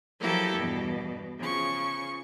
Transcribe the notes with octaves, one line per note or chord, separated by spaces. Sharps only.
F3 F#3 A#3 E4 G4 A4
E2 G2 B2
C#3 F3 C#6